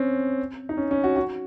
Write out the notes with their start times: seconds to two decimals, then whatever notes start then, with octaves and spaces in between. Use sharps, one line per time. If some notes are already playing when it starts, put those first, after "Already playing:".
Already playing: C4 C#4
0.69 D#4
0.77 C#4
0.91 C#4
1.04 F#4
1.16 F#4